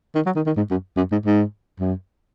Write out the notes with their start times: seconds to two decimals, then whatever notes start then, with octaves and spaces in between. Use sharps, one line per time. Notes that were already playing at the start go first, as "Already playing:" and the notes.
0.15 D#3
0.26 F#3
0.36 D#3
0.46 D#3
0.57 G#2
0.71 F#2
0.97 F#2
1.12 G#2
1.26 G#2
1.80 F#2